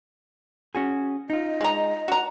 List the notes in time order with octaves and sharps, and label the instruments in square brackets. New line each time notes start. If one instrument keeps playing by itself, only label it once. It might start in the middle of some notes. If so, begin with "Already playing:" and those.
[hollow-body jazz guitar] C#4 F#4 G#4
[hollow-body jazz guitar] D#4 F4 [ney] D#5
[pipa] G#3 A#5
F#4 A#5